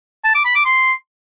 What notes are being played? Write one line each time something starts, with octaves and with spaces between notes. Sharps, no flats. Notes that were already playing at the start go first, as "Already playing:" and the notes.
A5
D6
B5
D6
C6